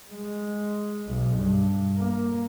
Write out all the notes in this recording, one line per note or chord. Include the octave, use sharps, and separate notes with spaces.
G#3
B1
G2
A#3